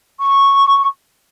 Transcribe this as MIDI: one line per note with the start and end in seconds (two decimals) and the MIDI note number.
0.20 0.86 85